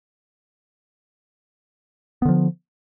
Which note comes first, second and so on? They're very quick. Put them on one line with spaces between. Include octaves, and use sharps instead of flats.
B3 D3 F3